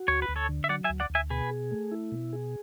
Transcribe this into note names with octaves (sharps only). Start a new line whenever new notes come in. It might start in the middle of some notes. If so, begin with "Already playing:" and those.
Already playing: F#4
D2 C#5
B4
D2
A4 C#5
D3
E5
F#3 D5 F#5
E5 G#5
D2
D5 F#5
D2
E5 G#5
B2 G#4 B4
G#4
A3
E4
B2
G#4